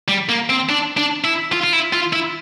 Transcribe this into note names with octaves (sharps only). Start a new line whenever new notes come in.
G3
A#3
C4
D4
D4
E4
F4
F4
E4
F4
E4